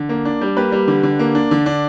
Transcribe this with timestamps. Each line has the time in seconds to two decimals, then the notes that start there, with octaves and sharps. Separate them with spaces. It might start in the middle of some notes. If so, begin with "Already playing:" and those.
Already playing: D3
0.09 A#3
0.25 D4
0.41 G3
0.56 A#3 G4 B4
0.72 G3
0.88 D3
1.03 D3
1.19 A#3
1.35 D4
1.51 D3
1.66 D4